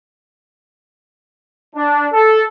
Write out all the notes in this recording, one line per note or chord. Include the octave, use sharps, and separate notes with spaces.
D4
A4